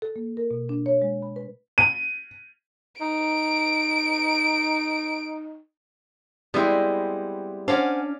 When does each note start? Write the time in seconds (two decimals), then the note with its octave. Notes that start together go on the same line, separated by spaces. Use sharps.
0.02 A4
0.16 A#3
0.37 A#4
0.51 B2
0.69 D4
0.86 C#5
1.02 G#3
1.22 B5
1.36 B4
1.78 D#7
3.01 D#4 D7
6.54 G3 G#3 B3 C4 E4
7.68 C#4 D4 C5 D5 F5 F#5 G#5